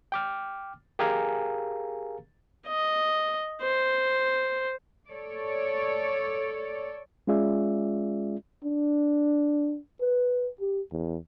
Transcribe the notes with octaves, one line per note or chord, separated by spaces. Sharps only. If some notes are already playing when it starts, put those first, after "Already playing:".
G5 D6 F6
G4 G#4 A#4 F5 G#5 A#5
D#5
C5
A4 C#5 D5
G#3 C#4 F4 G#4 D5 E5
D4
B4
G4
E2